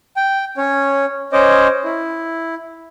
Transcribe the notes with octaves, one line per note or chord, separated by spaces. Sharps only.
G5
C#4 C#5
C#4 C5 C#5 D#5 D6
E4